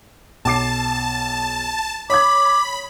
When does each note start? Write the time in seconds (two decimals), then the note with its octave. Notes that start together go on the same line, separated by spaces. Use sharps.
0.45 B1 A5 D6 C7
2.10 C#5 B5 D6 D#6 G#6